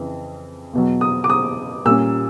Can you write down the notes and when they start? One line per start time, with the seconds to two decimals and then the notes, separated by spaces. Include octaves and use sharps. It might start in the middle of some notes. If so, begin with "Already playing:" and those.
Already playing: F2 C#3 E3
0.73 E2 B2 F#3
1.01 D#6
1.24 D6
1.30 D#6
1.86 A#2 G3 A#3 C#4 E6